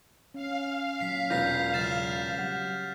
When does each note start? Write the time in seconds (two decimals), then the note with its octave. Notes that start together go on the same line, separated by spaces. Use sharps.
0.34 C#4 F5
1.00 A#2 F#3 C#4 B6 C7
1.30 E1 F4 B4 G6 A#6 B6
1.74 C#3 F#3 E5 F6 A6 E7
2.38 F#3 G3 F#5